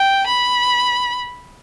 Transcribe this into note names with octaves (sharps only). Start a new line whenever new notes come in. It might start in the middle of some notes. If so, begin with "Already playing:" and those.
Already playing: G5
B5